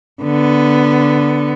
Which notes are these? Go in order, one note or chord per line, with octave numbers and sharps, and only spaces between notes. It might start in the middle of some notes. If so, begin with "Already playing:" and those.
D3 B3